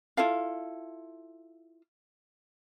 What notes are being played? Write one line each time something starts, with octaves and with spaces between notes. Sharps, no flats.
E4 F4 A4 F5